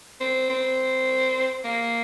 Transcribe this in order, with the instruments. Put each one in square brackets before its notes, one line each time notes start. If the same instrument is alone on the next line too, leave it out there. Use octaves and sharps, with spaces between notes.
[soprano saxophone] C4
C4
A#3